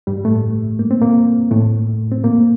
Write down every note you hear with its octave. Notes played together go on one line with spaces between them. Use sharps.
G2 G3
A2 A3
A#3
C4
A#2 A#3
A2 A3
C4
A#2 A#3